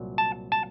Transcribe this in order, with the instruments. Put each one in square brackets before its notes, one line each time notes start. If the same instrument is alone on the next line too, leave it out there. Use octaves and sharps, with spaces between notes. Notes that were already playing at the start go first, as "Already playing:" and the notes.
Already playing: [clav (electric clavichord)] C2 A#2 F#3
A5
A5